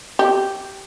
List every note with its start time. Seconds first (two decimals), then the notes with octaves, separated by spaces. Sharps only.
0.19 G4